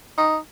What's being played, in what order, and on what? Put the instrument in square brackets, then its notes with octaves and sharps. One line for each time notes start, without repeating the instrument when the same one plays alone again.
[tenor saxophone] D#4